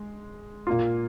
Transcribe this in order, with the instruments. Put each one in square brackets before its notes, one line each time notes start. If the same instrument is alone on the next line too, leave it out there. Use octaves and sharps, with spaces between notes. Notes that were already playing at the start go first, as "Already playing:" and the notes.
Already playing: [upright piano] G#3
A#2 A#3 F4